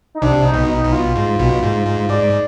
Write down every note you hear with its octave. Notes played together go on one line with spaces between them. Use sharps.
D#4
C2 C3 D4
D#4
B1 B2
D#4
B1 B2
F4
G#2
B1 B2
G#2
G#2
G#2 D5